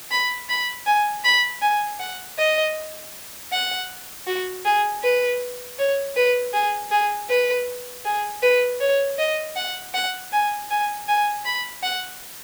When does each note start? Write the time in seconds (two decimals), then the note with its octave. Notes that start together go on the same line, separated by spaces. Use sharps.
0.11 B5
0.49 B5
0.86 G#5
1.24 B5
1.61 G#5
2.00 F#5
2.38 D#5
3.52 F#5
4.27 F#4
4.65 G#4
5.03 B4
5.78 C#5
6.16 B4
6.53 G#4
6.91 G#4
7.29 B4
8.05 G#4
8.42 B4
8.81 C#5
9.19 D#5
9.56 F#5
9.94 F#5
10.32 G#5
10.70 G#5
11.08 G#5
11.45 B5
11.83 F#5